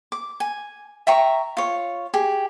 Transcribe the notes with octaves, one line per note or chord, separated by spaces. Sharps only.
D6
G#5
E5 G5 A#5 C#6
F4 C#5
G4 G#4